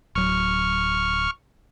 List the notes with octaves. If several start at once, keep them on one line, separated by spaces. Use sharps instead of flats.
D1 F#3 C#6 F6